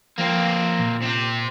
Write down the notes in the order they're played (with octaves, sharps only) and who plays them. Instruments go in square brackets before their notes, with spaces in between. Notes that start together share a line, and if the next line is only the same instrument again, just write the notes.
[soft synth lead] F3 [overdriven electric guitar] A#3 C4
[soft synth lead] A#2
[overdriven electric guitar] C3 C4